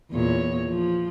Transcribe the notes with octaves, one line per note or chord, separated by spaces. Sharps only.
E2 A#2 C#5
F3